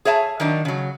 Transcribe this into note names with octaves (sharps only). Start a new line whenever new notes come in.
G#4 C#5 E5 G#5 A5
D#3 F#3 D4 D#4
C#3 F#3